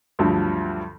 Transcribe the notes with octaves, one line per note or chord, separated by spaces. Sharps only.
D2 G2 F3 F#3